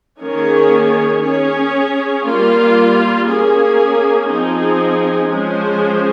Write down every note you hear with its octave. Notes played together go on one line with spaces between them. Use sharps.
D#3 A#3 C#4 G#4 C#5
C#4 G#4 C#5
G3 A#3 F4
A#3 C#4 G#4
F3 C4 D#4 G#4
F3 G#3 C#4 G#4 C5